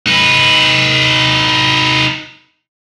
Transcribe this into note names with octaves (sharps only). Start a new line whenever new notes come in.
D#4 B4